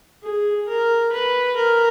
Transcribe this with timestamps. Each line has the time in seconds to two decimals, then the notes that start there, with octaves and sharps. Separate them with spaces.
0.23 G#4
0.68 A#4
1.12 B4
1.56 A#4